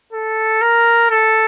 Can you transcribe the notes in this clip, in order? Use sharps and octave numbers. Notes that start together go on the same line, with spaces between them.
A4
A#4
A4